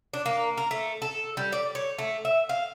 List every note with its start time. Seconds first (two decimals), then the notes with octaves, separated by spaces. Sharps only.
0.13 D4
0.26 A#3
0.57 A#4
0.71 A3
1.02 A4
1.37 G3
1.52 D5
1.75 C#5
1.98 A3
2.25 E5
2.49 F5